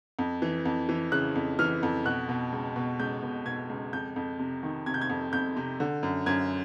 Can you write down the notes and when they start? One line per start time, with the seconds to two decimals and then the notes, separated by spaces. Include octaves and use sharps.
0.19 F2
0.42 E3
0.65 F2
0.89 E3
1.12 C#3 F#6
1.35 F2
1.59 E3 F6
1.83 F2
2.05 B2 F#6
2.29 B2
2.52 C#2
2.76 B2
2.99 C#2 G6
3.22 B2
3.46 B2 G#6
3.69 C#2
3.93 F2 G6
4.16 F2
4.40 C3
4.63 D#3
4.86 C3 G#6
4.94 G6
5.01 G#6
5.09 F2
5.33 F2 G6
5.57 C3
5.80 D3
6.03 F#2
6.26 F#2 G#6